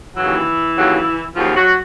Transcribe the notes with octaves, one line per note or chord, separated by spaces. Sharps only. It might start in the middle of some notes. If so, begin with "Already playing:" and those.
D#2 C#3 E3 F#3 E4
D#2 C#3 F#3
D#2 C#3 F3 F#3 F4
F#3 F#4